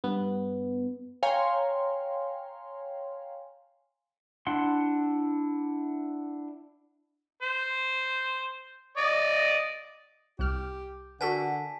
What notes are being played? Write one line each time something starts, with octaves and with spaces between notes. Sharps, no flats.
G2 B3
C#5 F5 G5 G#5 A#5 C6
D4 E4 F#5 C6
C5
D5 D#5
C2 G4 F6
D3 F#4 A4 A#4 F#5 G#5 A5 B6